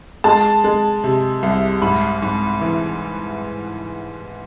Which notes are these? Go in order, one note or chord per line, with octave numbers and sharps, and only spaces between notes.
G#3 A5
G#3
C3
C2
G#2 B5
G#2
E3